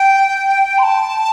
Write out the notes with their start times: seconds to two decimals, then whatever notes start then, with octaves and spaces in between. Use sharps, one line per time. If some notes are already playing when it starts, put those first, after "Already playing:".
Already playing: G5
0.78 C6
0.83 A5